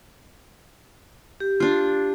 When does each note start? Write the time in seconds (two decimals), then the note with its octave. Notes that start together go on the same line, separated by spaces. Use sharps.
1.40 G4
1.60 D4 F4